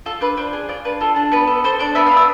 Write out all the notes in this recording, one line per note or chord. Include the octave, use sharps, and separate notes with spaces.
F4 A4
D4 B4
D4 C5
G#4
F4 D5
D4 B4
F4 A4
D4
B3 B4
A4
A4 C5
D4 D5
B3 E5
F5
D4
E6